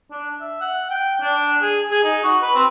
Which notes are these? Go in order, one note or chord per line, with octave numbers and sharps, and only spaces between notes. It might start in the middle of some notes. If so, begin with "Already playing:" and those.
D4
E5
F#5
G5
D4
G#4
G#4
D#4
F#4
B4
C4